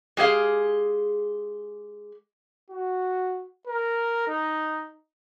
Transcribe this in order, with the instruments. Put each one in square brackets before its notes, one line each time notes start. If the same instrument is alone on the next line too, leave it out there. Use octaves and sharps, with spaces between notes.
[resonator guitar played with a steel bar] G#3 G4 G#4 F5
[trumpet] F#4
A#4
D#4